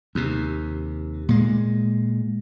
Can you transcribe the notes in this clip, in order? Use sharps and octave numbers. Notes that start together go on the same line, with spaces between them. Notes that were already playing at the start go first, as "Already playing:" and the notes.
D#2 C3
A#2 G#3